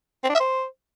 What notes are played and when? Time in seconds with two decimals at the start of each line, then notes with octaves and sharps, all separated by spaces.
0.24 C4
0.29 D4
0.35 E5
0.40 C5